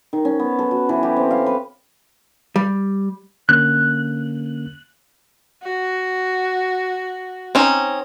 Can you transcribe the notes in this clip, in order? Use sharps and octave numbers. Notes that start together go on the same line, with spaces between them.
D#3
C#4
B3
A4
F#4
E3
G4
C4
F5
B4
G3
D3 A#3 C#4 F#6
F#4
C4 C#4 D#4